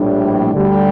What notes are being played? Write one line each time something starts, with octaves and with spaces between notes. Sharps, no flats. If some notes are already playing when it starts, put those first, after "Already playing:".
Already playing: A#1 A2 G3 D4
D2 D3 G3 D4